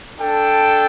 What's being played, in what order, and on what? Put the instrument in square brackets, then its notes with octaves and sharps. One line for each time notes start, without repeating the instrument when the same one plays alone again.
[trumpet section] D4 A4 G5